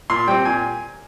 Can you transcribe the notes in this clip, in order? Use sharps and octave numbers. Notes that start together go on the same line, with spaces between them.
A#2 C6
G3 C4 G5
A#2 G#5